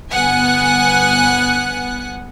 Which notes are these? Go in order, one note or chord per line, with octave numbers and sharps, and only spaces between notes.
G1 B3 F#5 G#5 F#6